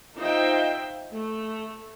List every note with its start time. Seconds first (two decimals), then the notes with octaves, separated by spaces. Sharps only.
0.18 D#4 F4 C5 E5 G5
1.13 A3